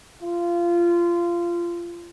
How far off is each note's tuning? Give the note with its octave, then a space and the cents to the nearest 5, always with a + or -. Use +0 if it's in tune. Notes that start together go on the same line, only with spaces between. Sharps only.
F4 -20